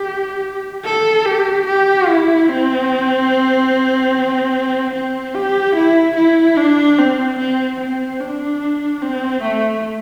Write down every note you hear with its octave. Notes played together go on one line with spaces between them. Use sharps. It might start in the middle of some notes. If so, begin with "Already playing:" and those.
Already playing: G4
A4
G4
G4
E4
C4
C4
G4
E4
E4
D4
C4
C4
C4
D4
C4
A3